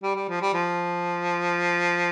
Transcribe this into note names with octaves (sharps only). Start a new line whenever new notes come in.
G3
G3
F3
G3
F3